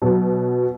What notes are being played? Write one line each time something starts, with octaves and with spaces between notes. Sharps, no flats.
B2 F#3 B3